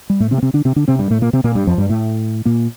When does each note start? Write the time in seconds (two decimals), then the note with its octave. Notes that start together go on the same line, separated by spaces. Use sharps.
0.10 G3
0.20 A2 A3
0.31 C3 C4
0.38 A#3
0.42 C3 C4
0.54 D3 D4
0.65 C3 C4
0.76 D3 D4
0.88 C3 C4
0.99 G2 G3
1.10 A2 A3
1.22 A#2 A#3
1.33 C3 C4
1.44 A#2 A#3
1.55 G2 G3
1.67 F2 F3
1.78 G2 G3
1.89 A2 A3
2.45 A#2 A#3